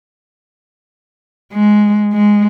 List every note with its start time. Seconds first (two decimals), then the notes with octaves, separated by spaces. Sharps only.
1.54 G#3
2.14 G#3